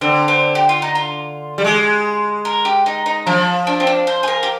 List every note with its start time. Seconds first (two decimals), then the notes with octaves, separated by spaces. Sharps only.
0.01 D3 C4
0.28 C4
0.55 G4
0.69 F4
0.82 D#4
0.95 F4
1.58 G3
1.64 G#3
2.45 A#4
2.65 G4
2.86 D#4
3.06 D#4
3.26 F3 D4
3.67 D4
3.80 C4
3.87 D4
4.07 C5
4.23 G#4
4.28 A#4
4.43 G4